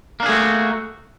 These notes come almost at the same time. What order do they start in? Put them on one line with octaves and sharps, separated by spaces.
A#3 D4 G#4 A3 F#4